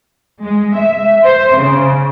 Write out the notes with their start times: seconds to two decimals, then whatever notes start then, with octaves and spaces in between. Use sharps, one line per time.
0.42 G#3
0.74 E5
1.23 C5
1.55 C#3